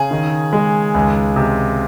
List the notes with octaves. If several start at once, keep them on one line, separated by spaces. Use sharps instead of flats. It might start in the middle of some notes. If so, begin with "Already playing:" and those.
Already playing: C#3 G#4
D#3
G#3
C#2
C3